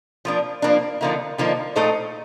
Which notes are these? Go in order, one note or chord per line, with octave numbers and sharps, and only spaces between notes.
F3 A#3 D4
F3 A#3 D4
D3 F3 A#3 D#4
D3 F3 A#3 D#4
A#2 A3 D#4 A4 C5